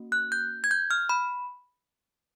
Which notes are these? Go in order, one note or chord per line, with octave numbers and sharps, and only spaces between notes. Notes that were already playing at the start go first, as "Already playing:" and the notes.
Already playing: A#3 C#4 F#4
F#6
G6
G#6
G6
F6
B5